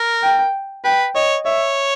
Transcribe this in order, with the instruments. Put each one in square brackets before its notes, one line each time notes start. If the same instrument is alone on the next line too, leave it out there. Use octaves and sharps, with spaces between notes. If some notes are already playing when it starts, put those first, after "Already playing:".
Already playing: [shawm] A#4
[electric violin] G5
[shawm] B4 [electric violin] G5
[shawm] C#5 [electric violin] D#5
[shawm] C#5 [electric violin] E5